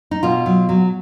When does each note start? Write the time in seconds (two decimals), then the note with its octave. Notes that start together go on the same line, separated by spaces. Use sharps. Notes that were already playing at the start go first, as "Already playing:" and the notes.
0.11 D#4
0.23 B2 F4
0.46 F#3
0.69 F#3